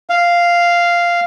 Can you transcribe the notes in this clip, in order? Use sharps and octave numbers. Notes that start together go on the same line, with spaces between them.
F5